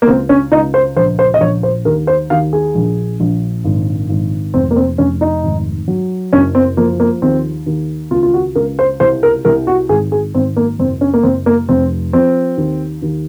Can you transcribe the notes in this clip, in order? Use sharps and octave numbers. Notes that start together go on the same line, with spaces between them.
A#3
C#2 C4
C#4
C#2 D#4
C5
A#1 C5
C5
D#5
A#1 C#5
C5
D#2 A#4
C5
D#2 F5
G#4
A#1
A#1
G#1
G#1
F1 C4
A#3
C4
F1 C#4
D#4
G#1
F#3
F#1 C#4
C4
F3 A#3
A#3
D#2 C4
D#2
C#2 F4
F4
F#4
C#2 A#4
C5
C2 C5
A#4
C2 A#4
F#4
G#1 G#4
G#4
G#1 C4
A#3
F#1 C4
C#4
A#3
F#1 C4
A#3
F1 C4
F3 C4
D#2
D#2